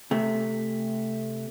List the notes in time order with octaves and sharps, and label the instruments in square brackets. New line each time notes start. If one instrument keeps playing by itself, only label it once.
[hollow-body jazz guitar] C3 A3